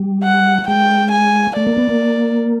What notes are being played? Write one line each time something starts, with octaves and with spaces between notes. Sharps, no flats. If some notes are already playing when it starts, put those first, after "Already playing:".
Already playing: G3
F#5
G#3 G5
G#5
A3 D5
A#3
B3
A#3